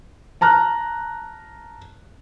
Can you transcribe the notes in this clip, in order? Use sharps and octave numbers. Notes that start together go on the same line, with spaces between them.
A5 A#5 F6 F#6